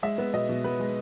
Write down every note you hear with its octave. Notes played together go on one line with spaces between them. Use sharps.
G#3 E5
B3
B2 D#5
B2
B3 B4
G#3